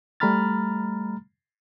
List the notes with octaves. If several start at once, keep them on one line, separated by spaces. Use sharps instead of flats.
G3 A3 A#5 B5 F6 A6